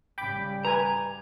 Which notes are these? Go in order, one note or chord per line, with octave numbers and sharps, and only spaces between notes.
G#1 C#3 G3 G5 B5 D6
B4 G#5 A#5